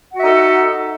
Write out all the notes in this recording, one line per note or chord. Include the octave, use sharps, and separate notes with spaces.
D#4 F#4 A4 E5 F#5